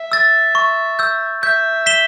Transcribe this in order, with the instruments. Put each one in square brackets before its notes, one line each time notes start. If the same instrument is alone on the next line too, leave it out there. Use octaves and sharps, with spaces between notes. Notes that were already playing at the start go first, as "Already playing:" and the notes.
Already playing: [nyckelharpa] E5
[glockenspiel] E6 A6
C#6
E6 G6
[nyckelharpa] E5 [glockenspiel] G6
[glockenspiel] B6 E7 G7